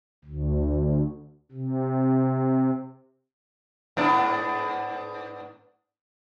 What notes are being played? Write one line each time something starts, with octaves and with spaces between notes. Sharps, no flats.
D2
C3
G#2 B3 D4